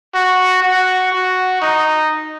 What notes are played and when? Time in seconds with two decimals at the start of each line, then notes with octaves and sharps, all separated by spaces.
0.14 F#4
0.63 F#4
1.12 F#4
1.61 D#4